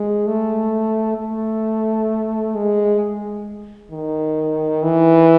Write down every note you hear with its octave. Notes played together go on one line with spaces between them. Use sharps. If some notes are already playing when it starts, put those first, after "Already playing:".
Already playing: G#3
A3
A3
G#3
D#3
E3